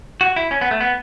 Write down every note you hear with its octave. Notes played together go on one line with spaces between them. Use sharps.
F#4
E4
C#4
B3
A3
B3